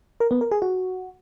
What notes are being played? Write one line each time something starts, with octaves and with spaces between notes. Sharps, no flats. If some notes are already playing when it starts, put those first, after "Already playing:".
A#4
B3
A#4
G#4
F#4